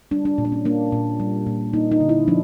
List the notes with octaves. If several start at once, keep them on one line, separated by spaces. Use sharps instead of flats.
G3 D4
D4
A#2
D4
C#4
A#3 D4
A#2
G3
A#2
A#3 D#4
D#4
D3
E4
F3 D4